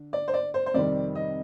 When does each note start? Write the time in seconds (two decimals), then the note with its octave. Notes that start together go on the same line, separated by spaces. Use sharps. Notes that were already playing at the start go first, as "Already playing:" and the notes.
Already playing: D3
0.13 D5
0.28 C5
0.34 D5
0.54 C5
0.66 C5
0.74 F2 C3 D#3 G3 C4 D5
1.15 D#5